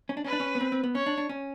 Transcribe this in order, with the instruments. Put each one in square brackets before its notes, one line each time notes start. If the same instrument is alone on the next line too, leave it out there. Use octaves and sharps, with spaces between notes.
[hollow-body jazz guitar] C#4
D4
[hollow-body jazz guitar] C#4 [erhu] B4
[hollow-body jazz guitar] D4
C#4
B3
C4
C4
B3
[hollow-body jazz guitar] C#4 [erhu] C#5
[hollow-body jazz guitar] D4
D4
C#4